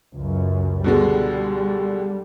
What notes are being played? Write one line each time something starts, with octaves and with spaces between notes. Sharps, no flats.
C#2 F#2
B2 D3 G3 G#3